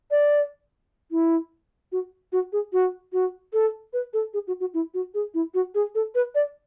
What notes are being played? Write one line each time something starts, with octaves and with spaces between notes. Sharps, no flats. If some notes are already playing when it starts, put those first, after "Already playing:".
D5
E4
F#4
F#4
G#4
F#4
F#4
A4
B4
A4
G#4
F#4
F#4
E4
F#4
G#4
E4
F#4
G#4
A4
B4
D5